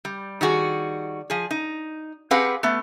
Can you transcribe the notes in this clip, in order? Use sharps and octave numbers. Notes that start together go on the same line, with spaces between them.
G3
D#3 G3 F#4 G#4
F3 G#4
D#4
C4 G4 G#4 B4 F5 F#5
A3 B3